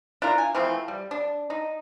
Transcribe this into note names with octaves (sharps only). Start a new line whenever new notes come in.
D4 E4 F4 A#4
G#5
E3 F3 A3 C4
G3
D4
D#4